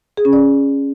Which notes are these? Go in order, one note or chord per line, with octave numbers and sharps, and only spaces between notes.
G#4
C#4
D5